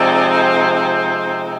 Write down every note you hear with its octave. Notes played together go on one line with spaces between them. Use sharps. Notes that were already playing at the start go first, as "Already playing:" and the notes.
Already playing: C3 F3 G#3 C4 D#4 D5
C5
C5